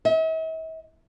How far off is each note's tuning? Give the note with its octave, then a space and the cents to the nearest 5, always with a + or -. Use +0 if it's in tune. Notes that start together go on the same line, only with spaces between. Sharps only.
E5 -45